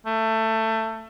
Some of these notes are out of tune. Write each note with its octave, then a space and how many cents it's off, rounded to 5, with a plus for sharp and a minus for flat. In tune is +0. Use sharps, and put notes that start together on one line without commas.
A3 +20